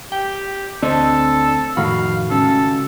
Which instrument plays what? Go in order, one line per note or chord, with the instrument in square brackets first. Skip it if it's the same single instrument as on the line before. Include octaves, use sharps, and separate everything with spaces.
[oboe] G4 [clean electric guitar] G5
[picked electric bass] D2 [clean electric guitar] C4 D#5 [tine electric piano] D4 C5 [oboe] A4
[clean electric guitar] F2 B5 [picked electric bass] A2 D#3 A3 [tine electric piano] F#4 [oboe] F5
[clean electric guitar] C#2 C#4 [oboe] A4